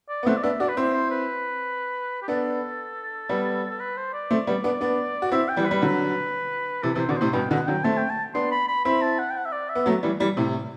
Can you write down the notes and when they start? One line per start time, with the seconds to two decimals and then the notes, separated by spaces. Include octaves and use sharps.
0.09 D5
0.23 B3
0.26 A3 C4 F#5
0.37 D5
0.43 B3 D4 E5
0.60 D4 F#4 D5
0.69 B4
0.77 C4 E4 C5
0.94 C5
1.11 B4
2.23 G4
2.28 B3 D4 A4
3.29 G3 B3
3.70 A4
3.80 B4
3.97 C5
4.13 D5
4.31 A3 C4
4.47 G3 B3
4.64 B3 D4
4.81 B3 D4
5.22 F#4
5.32 C4 E4 E5
5.49 G5
5.56 E3 G3
5.65 B4
5.71 G3
5.82 D3 F#3
6.83 C3 E3 A4
6.95 C3 E3
7.00 C5
7.09 B2 D3 D5
7.17 A2 C3 C5
7.33 G2 B2 G5
7.50 B2 D3 F#5
7.68 D3 F#3 G5
7.84 A3 C4 A5
7.97 G5
8.10 A5
8.35 B3 D4 C6
8.52 B5
8.68 B5
8.85 C4 E4 B5
9.02 A5
9.19 F#5
9.30 G5
9.37 F#5
9.45 E5
9.52 D5
9.69 E5
9.75 B3
9.86 F#3 A3
10.03 E3 G3
10.20 E3 G3
10.37 A2 C3